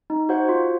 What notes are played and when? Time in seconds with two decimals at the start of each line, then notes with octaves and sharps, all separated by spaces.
0.10 D#4
0.29 F#4 C5 F#5
0.49 F4